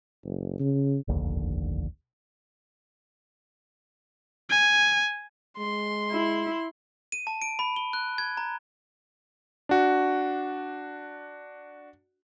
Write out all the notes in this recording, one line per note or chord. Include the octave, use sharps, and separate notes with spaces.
F#1
C#3
F1 A#1 D#2 D3
G#5
G#3 C6
E4
D#7
A5
D7
B5
G7
F#6
G#6
A#5
D4 F#4